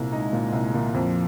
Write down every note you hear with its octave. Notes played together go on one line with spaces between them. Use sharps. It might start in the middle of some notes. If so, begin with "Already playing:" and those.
Already playing: C2 A#2 A#3
G#3 D#4
A#2
C2
A#2
F2 F3